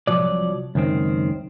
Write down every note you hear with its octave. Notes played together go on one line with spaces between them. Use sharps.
C2 C3 F3 F#3 D5
C#2 F#2 D#3 C4